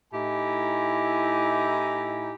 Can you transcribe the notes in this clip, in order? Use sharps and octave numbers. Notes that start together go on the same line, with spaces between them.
A2 D#4 E4 G4 G#5 A#5